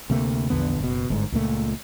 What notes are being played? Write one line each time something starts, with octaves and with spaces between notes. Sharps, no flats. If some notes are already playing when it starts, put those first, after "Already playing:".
D2 C3 A3 A#3
A#1 E2 D3 B3
F#1 B2
G1 G#2
C#2 A#2 A3